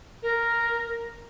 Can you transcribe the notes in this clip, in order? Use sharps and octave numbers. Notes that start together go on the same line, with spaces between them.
A#4